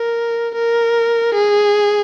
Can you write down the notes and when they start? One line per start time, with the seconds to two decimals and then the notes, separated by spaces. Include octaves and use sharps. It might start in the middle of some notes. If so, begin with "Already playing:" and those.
Already playing: A#4
0.55 A#4
1.34 G#4